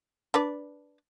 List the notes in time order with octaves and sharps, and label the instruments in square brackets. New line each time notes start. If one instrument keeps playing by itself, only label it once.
[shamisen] D4 B4 D5